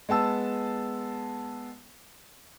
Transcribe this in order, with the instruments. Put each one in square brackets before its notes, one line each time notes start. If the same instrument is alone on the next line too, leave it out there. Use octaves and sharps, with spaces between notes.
[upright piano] G#3 B3 A5 E6